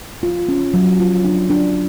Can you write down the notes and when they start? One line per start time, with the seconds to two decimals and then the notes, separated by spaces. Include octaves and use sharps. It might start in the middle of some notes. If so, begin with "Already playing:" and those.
0.23 F4
0.49 C#4
0.74 F#3
1.00 F4
1.25 D4
1.50 D4